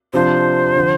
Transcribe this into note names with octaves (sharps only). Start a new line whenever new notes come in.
C3 F3 D4 F4 C5
D3 F3